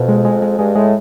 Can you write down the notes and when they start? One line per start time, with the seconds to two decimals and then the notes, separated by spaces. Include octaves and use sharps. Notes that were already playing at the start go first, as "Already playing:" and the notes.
Already playing: F2 B2
0.09 G#3
0.25 G#3
0.42 G#3
0.59 G2 G#3
0.75 A2 G#3